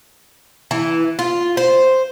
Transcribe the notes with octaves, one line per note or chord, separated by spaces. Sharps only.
E3
F4
C5